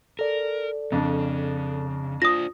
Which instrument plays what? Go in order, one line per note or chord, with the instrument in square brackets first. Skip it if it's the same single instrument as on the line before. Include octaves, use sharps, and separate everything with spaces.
[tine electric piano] A4 D5 [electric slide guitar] A#4
[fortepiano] F2 D4 [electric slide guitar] C#3
[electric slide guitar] D4 C5 [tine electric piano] F4 [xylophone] D#6 A#6